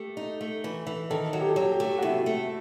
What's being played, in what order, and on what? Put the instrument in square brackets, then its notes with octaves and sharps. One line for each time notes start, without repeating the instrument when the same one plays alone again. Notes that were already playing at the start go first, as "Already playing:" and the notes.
Already playing: [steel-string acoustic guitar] A3 [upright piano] G4
[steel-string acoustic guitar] D#4
A3
E3
E3
[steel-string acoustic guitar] D#3 [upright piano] A4
[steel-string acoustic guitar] F#3
[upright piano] G4
A4
[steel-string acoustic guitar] F#3 [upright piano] G4
[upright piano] G4
[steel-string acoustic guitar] A3
[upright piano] F#4
[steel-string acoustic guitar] C3 [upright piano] E4
[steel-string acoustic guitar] A3